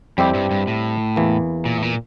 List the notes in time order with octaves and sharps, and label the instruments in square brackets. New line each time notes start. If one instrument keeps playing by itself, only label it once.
[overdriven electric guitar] F2 [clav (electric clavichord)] G3 C4 E4 G4
[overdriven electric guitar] G2
G2
A2
[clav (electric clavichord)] E2 E3 A#3
[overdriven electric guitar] A#2
A2
A#2